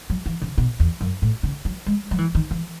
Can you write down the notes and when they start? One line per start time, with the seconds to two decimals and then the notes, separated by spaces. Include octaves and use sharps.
0.10 F#3
0.26 E3
0.42 C#3
0.58 B2
0.80 E2
1.01 F#2
1.22 A2
1.43 C#3
1.65 F#3
1.86 G#3
2.11 F#3
2.18 E3
2.35 D#3
2.51 E3